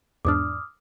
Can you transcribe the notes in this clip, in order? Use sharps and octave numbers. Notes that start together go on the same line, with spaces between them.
E2 G#2 D4 D6 D#6 F6